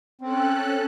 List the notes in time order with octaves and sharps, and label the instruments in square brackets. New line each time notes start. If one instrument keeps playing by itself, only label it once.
[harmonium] C4 [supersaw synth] C#4 A4 F#6